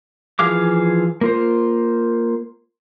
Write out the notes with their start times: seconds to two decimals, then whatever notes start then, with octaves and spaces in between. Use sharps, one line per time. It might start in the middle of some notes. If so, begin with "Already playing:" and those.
0.39 E3 F3 G#4 F5 D6
1.21 A#3 F4 C5